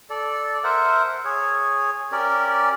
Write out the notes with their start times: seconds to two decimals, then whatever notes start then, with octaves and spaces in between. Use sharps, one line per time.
0.10 A4 D5
0.64 A#4 C5 E5 F#5
1.25 G#4 C#5
2.12 C#4 G4 A#4 D5